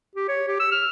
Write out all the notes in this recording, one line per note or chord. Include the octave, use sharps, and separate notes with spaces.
G4
C#5
G4
E6
F6